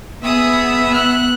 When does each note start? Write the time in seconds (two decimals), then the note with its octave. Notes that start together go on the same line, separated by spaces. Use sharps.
0.24 B3 G#4 E5 D#6
0.93 F#6